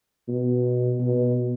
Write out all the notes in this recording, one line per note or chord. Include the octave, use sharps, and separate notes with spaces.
B2
B2